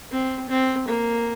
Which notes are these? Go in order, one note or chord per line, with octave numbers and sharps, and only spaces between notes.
C4
C4
A#3